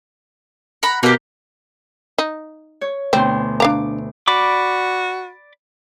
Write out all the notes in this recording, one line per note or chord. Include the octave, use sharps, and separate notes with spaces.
F#5 A#5 B5
B2 A#3 G4
D#4
C#5
D2 B2 C4 C6
D4 F5 A#5 D6
F#4 D5 B5 D6